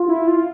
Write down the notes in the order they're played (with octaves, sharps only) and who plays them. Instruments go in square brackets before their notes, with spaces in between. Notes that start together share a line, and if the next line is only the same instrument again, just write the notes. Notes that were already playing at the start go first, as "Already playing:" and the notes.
Already playing: [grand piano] F4
[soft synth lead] E4
F4